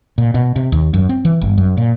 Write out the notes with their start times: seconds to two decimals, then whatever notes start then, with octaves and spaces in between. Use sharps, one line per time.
0.18 A#2
0.34 B2
0.56 C3
0.72 D#2
0.94 F#2
1.09 C4
1.25 E3
1.41 G1
1.58 F#2
1.77 A#2